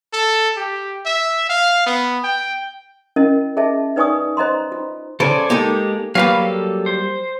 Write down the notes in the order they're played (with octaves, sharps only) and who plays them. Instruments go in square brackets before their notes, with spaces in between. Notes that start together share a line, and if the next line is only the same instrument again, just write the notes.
[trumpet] A4
G4
E5
F5
B3
G5
[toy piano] C#4 E4 A#4 D#5
G#4 D#5 E5 A5
D#4 B4 D5 G#5 C#6 D#6
C5 D#5 A#5 C6
F4
[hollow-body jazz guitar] C#3 C5 [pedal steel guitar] A4 D5 G#5
[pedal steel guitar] G#3 G4 [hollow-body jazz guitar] A#3 D#4 A4
[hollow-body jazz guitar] F#3 G3 A#3 [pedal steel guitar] B4 F5
[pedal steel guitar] A4
C5